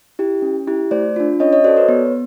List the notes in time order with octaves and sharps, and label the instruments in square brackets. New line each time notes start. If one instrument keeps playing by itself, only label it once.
[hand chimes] E4 G4
C#4
E4 G4
A3 C5 D5
D4 F4
C#4 C#5 D#5
C#5 D#5
F#4 C5 D5
A4
B4 C#5
B3